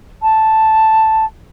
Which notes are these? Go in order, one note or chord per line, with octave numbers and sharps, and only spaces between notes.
A5